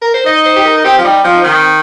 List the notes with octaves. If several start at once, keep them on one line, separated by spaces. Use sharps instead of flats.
A#4
C5
D#4 D#5
C5
G4
A#4
A#4
C4 G4
F3
G3 D#4
F3 C4
D#4
D#3 C4